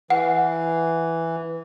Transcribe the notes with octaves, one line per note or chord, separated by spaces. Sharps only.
E3 F#5